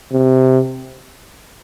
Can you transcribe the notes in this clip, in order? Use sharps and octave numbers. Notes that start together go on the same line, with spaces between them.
C3